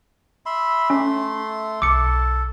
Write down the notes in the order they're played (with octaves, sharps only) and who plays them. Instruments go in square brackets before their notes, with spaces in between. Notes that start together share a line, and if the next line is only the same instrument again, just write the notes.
[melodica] E5 B5 C6
[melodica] A3 C6 [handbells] C#4
[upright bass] B1 E4 [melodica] A4 [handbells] D6 C#7